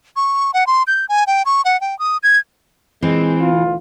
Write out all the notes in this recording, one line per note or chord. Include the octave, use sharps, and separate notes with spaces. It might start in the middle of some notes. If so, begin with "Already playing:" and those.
C#6
F#5
C6
G6
G#5
G5
C#6
F#5
G5
D#6
G#6
A#2 E3 G#3 C4
D2 B2 F4